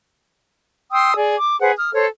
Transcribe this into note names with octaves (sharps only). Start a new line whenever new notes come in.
G5 C6 D#6 E6
G#4 D5
D6
G#4 B4 C5 F#5
D#6 F6
A4 C5 C#5